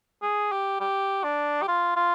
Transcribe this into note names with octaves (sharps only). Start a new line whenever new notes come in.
G#4
G4
G4
D4
G4
F4
F4